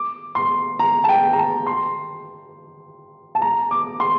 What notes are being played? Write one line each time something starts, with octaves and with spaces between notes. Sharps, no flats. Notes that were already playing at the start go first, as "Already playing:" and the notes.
Already playing: D6
C6
A#5
A5
G5
A#5
A5
C6
A5
A#5
D6
C6